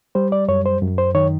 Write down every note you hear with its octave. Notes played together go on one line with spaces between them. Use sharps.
G3 C5
D5
F#2 C#5
C5
F#2
C5
D#3 C#5